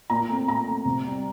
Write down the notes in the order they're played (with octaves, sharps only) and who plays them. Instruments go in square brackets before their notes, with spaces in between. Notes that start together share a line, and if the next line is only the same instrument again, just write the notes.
[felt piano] A#2 A#5
A3 C4
A#2 A#5
A3 C4
C3
G3 C4